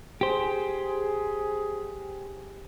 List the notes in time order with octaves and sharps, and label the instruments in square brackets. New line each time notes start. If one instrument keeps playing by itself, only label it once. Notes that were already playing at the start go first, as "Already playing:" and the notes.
[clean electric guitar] G4 C5 [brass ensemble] G#4